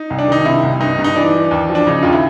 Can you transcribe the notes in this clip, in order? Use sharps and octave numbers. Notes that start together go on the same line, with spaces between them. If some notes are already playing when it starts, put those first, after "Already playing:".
Already playing: D#4
C2
D4
D#3 D#4
C3 E4
C2
G2 D#4
G2
D#4
E3 D4
E3
D#2
F3
D4
C#3 D#4
D#2 F4
E4